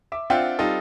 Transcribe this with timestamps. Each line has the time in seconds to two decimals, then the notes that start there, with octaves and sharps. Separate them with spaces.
0.12 E5 D6
0.30 C4 D4 F4 E5 F#5 G5
0.59 G3 C4 D#4 F4 A4